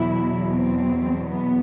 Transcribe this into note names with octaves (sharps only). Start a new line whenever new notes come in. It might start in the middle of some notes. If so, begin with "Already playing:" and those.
Already playing: E2 B2 F#3 E4
C4
B3